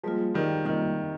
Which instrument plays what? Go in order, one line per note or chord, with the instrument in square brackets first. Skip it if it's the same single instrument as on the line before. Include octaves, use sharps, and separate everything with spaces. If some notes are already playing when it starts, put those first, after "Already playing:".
[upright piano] F3 G#3 [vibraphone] G3 A#3 F4
[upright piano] D#3 G3
[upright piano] C3 D#3 [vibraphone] G3 A#3 F4